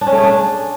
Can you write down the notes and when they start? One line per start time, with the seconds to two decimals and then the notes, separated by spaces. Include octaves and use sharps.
0.01 D4
0.07 C#4
0.12 A3
0.18 G#4
0.23 D4